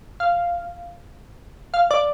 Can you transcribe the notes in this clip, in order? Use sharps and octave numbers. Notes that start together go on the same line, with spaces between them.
F5
F5
D5